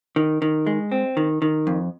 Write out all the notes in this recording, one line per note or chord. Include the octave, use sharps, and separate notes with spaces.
D#3
D#3
G#3
C4
D#3
D#3
F2